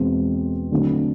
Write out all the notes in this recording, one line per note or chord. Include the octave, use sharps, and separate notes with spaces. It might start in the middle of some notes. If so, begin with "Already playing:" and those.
Already playing: E2 B2 G#3 C4
D3 F#3 A3 C4